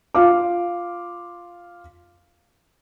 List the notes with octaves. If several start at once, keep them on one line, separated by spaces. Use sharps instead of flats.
F4 F5 D6